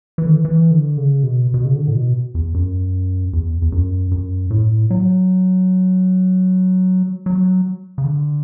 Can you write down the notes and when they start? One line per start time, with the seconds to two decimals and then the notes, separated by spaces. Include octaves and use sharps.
0.18 E3
0.26 D3
0.33 E3
0.45 E3
0.71 D3
0.97 C#3
1.23 B2
1.54 B2
1.65 C#3
1.76 D3
1.88 A2
1.96 B2
2.35 E2
2.54 F#2
3.33 E2
3.62 E2
3.72 F#2
4.11 F#2
4.51 A2
4.90 F#3
7.26 F#3
7.98 C#3
8.05 D3